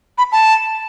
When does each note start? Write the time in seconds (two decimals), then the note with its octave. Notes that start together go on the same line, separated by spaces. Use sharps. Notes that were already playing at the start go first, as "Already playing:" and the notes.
0.18 B5
0.32 A5